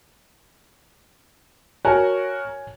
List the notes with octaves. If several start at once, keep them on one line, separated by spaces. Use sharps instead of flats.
F#4 A#4 C#5 G#5